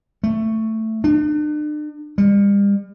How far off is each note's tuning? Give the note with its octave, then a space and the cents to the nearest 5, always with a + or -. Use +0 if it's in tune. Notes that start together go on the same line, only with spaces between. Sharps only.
A3 +10
D4 +40
G3 +40